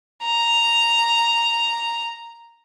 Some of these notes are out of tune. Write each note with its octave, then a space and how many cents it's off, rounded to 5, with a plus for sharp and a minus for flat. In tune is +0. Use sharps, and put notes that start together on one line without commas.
A#5 +0